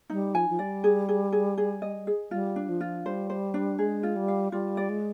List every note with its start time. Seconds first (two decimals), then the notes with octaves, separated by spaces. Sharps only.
0.10 G3 D#4
0.34 F3 G#5
0.49 F3
0.59 G3 D5
0.84 G#4
1.09 G#4
1.32 G#4
1.58 G#4
1.82 D#5
2.07 G#4
2.31 G3 F4
2.56 D4
2.69 F3
2.81 F4
3.05 G3 C5
3.30 C5
3.54 D4
3.78 G#3 G#4
4.03 F4
4.16 G3
4.28 F5
4.52 G3 F4
4.77 D5
4.89 G#3